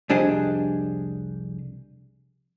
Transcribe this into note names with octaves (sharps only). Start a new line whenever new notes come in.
C2 F2 D4 G4 G#4 D#5